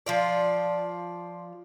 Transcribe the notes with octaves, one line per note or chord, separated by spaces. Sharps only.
F3 F4 D5